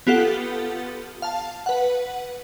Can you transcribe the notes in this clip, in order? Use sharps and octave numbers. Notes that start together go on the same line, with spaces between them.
B3 F4 G4 A4 F#5
F5 A5
B4 F#5